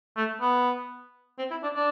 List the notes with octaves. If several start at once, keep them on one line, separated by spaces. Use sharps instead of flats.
A3
B3
C4
E4
D4
D4